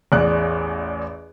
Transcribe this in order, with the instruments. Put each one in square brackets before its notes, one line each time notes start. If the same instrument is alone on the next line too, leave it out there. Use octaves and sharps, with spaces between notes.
[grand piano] A1 E2 D5 F#6